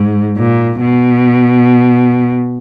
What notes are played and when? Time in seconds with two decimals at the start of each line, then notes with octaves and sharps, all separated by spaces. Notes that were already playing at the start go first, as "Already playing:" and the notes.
Already playing: G#2
0.38 A#2
0.80 B2